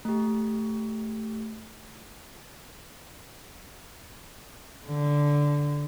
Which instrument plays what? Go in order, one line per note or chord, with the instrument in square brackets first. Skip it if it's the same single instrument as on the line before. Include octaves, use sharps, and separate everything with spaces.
[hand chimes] A3 G4
[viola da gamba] D3